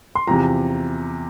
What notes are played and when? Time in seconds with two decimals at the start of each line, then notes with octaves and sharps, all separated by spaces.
0.15 C6
0.27 E2 C3 F3 A#5